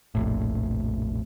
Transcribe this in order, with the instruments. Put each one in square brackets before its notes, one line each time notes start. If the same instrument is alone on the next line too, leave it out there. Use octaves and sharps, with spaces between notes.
[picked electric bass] F1 A#1 A2